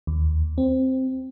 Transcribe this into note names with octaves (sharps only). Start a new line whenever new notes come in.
D#2
C4